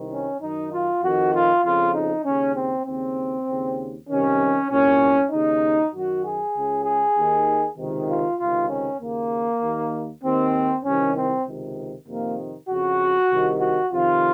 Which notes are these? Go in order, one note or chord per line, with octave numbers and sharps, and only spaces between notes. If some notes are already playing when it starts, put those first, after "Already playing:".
Already playing: C2 C3 D#3
C#4
F#2 D#3 D#4
F4
F2 D#3 F#4
F4
F2 C#3 F4
D#4
D#2 C#3 C#4
C4
D#2 C#3 C4
D#2 C#3
C2 C3 D#3 C#4
C2 A#2 C#4
D#2 C#3 D#4
F#2 D#3 F#4
G#4
C#2 C#3
G#4
D#2 D#3
C#2 C3 D#3
F4
C#2 C3 D#3 F4
C#4
D#2 C#3 A#3
D#2 D#3
D#2 D#3 C4
C2 C3 D#3 C#4
C4
C#2 C3 D#3
F2 C3 D#3 A#3
F2 C#3 F#4
C2 C3 D#3
F#4
F2 C3 D#3 F4